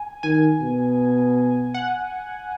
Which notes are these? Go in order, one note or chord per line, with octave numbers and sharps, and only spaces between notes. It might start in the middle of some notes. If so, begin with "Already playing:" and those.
Already playing: G#5
D#3 G#5
B2
F#5